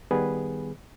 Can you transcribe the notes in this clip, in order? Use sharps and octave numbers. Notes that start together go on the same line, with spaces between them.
D#3 G3 B3 G#4 B4